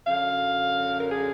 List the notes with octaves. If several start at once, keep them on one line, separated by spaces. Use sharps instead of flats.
F#2 D3 F#3 F5
A#4
G#4